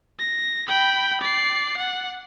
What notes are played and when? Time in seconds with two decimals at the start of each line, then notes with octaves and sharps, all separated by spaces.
0.19 A#6
0.68 G5 B5
1.21 D5 C7
1.77 F#5